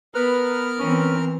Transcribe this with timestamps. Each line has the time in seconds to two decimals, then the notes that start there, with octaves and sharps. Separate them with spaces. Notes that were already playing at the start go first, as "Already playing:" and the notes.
0.14 B3 A#4 B4 A#5 F6
0.79 E3 C4 C#4